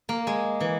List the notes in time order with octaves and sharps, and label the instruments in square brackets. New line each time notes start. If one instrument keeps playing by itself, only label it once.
[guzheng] A#3
G#3
E3